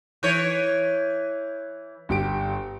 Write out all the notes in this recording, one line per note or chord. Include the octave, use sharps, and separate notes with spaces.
E3 C#5 G6
G1 G4 D7